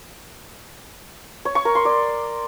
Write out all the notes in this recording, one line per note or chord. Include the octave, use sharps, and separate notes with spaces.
C#5
C#6
A#4
C6
D5